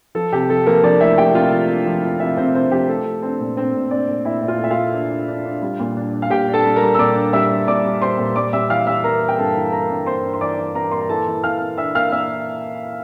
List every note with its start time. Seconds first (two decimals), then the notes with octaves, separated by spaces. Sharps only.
0.15 F3 A4
0.32 C3 G4
0.49 F3 A4
0.66 F3 A#3 A#4
0.83 F3 D4 D5
1.00 A3 E4 E5
1.18 F3 G4 G5
1.35 C3 F4 F5
1.52 F3
1.69 D4
1.86 F3
2.03 F3
2.20 C3 E4 E5
2.37 C3 C4 C5
2.55 C4 D4 C5
2.71 F3 G4
2.89 A3 A4
3.06 A3
3.22 C4 D4 C5
3.40 A#2
3.57 C4 D4 C5
3.74 A#2
3.91 A#2 D4 D5
4.09 A#2
4.25 A#2 E4 E5
4.43 A#2
4.48 F4 F5
4.60 A3 E5
4.71 F4 F5
4.77 A3
4.93 D4
5.10 D4
5.28 D4
5.45 D4
5.62 G3
5.80 A#2
5.97 D4
6.14 D4
6.22 F5
6.30 A#2 G4 G5
6.48 D4
6.53 A4 A5
6.65 G3
6.76 A#4 A#5
6.82 G3
6.95 E6
6.99 A#2 D5 D6
7.16 D4
7.33 G3 E5 E6
7.50 G3
7.67 A#2 D5 D6
7.84 G3
8.02 G3 C5 C6
8.18 A#2
8.36 G3 D5 D6
8.53 G3 E5 E6
8.70 E3 F5 F6
8.87 G3 E5 E6
9.04 A#3 A#4 A#5
9.21 A#3
9.28 G5
9.38 G2 A4 A5
9.56 E3
9.72 A#3 A#4 A#5
9.90 G2
10.06 A#3 C5 C6
10.24 G2
10.34 C6
10.41 E3 D5 D6
10.58 E3
10.75 G2 A#4 A#5
10.92 A#3 C6
11.01 A#5
11.09 E3 A4 A5
11.27 E3
11.44 E3 F5 F6
11.61 A#3
11.78 D4 E5 E6
11.95 A#3 F5 F6
12.12 A#3 E5 E6